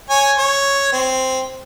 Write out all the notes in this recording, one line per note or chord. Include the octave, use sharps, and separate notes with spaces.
C#5 G#5
C#5
C4